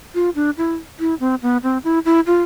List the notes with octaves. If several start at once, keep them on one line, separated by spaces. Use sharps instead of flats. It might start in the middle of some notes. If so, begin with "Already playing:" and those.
F4
D4
E4
E4
C4
B3
C4
E4
E4
F4